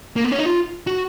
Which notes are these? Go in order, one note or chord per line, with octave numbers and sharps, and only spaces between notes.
A#3
B3
C#4
D#4
F4
F#4